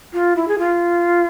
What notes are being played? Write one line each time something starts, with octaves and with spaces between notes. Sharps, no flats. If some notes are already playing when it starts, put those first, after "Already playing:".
F4
E4
G#4
F4